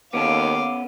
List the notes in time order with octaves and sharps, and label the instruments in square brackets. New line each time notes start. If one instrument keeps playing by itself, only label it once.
[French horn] D#2 [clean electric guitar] B3 C#4 A4 [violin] F5 [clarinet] D6